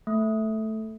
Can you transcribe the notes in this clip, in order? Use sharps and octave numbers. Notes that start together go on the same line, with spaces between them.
A3